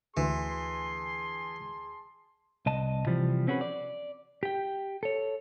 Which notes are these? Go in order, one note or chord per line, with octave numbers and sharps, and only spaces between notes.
D2 E3 G#4 A5 C6
C2 D#5 A5
C3 E3 F3 G3
C4 C#4 F#4 G#4 B4
D5
G4 G5
A4 C#5